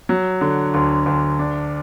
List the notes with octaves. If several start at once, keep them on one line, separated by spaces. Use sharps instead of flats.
F#3
D3
D2
D2
D4